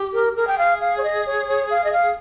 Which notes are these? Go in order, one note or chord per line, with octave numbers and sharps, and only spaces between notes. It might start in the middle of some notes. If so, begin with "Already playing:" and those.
Already playing: G4
A#4
G#4 A#4
G5
F5
F5
C#5
D#5
C#5
C#5
F5
D#5
F5